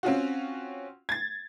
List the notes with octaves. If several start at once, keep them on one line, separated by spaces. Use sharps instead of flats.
C4 C#4 F4 F#4
G#6 A6